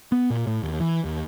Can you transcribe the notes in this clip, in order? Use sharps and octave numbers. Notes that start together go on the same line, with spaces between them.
B3
A#2
A2
D#2
E3
D#2